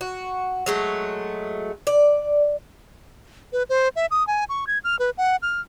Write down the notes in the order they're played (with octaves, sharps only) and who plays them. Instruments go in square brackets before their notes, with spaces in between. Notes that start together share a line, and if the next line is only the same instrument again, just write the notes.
[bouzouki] F#4
F#3 G#3 A3
D5
[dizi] B4
C5
E5
D#6
G#5
C#6
G#6
F6
B4
F#5
F6